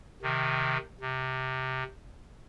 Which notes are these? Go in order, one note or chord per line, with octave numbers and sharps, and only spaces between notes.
C3 D#3
C3